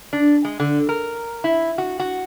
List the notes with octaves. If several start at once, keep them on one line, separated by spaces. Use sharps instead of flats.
D4
G#3
D3
A#4
E4
F#4
F#4